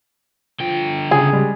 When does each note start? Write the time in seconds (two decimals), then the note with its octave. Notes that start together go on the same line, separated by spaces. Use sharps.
0.60 D3 F3 G5
1.11 C#3 G#4
1.32 G3 G#3